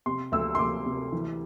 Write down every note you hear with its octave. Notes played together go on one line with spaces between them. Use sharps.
C3 C6
D2 E6
C6
D2 D6
C3
E3